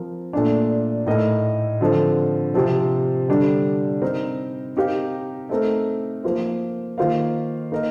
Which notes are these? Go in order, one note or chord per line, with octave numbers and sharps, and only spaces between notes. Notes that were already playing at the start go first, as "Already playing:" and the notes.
Already playing: F3 C4 A#4
A#2 A3 D4
A2 A3 D#4 A#4 D#5
D3 F3 C4
C3 F3 C4
D3 G3 D4
C4 D#4 A#4
C4 D#4 G4 A#4 F5
A3 C4 D#4 A#4
F3 A#3 F4 C5
D#3 A#3 F4 C5 F5
A#3 D#4 A#4 D#5